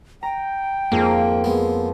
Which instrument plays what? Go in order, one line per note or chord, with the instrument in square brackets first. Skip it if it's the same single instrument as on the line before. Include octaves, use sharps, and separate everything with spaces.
[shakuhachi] G5 [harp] A#5
[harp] F2 [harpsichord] G#2 [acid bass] A#3
[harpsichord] G#3 B3